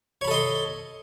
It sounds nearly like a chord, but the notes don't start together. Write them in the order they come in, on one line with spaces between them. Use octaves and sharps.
C#5 B5 A4 D#5 C6